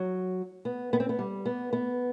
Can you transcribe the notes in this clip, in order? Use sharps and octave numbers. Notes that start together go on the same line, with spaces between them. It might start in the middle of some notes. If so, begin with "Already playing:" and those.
Already playing: F#3
B3
B3
C4
B3
G3
B3
B3